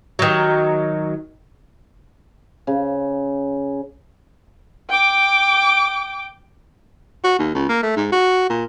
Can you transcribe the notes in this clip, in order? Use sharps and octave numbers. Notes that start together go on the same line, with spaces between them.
D#3 F#3
C#3
G5 D6
F#4
D#2
C#2
A#3
A3
G#2
F#4
A#2